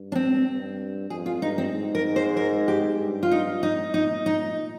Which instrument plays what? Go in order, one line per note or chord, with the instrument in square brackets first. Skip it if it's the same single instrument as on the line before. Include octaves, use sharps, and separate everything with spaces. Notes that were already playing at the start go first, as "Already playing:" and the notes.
Already playing: [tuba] G2
[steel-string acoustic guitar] D4
C4
[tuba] G2
[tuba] F2 [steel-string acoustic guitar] G#4
[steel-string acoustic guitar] F4
[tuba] G2 [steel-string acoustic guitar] D#4
[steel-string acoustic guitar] C4
[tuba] G#2
[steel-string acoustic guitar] A#4
C5
A#4
G4
[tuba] G2
[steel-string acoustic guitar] F4
D#4
D#4
[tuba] A#2 [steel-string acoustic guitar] D#4
[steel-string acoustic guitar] D#4